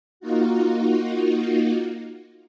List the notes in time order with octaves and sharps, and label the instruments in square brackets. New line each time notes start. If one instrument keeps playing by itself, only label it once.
[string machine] A#3 D#4 F4 F#4